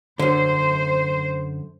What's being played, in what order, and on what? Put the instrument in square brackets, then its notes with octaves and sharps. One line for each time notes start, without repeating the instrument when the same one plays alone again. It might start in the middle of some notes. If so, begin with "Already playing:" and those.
[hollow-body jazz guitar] F#2 D3 [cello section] C5